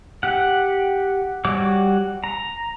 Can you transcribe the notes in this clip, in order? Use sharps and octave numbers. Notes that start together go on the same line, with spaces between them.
G4 F#5
G3 F#4 C#5 D6
A#5